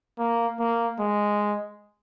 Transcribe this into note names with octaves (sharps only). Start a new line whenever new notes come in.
A#3
A#3
G#3